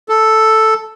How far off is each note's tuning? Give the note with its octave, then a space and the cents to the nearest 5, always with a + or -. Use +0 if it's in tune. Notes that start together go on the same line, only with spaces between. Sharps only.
A4 +0